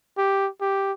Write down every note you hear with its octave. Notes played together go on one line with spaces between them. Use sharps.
G4
G4